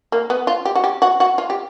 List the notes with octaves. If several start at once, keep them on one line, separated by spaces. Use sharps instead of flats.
A#3
B3
F4
G4
F#4
G4
F#4
F#4
F4
G4